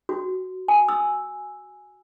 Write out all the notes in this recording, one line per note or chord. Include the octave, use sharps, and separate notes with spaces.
F#4
G#5
E6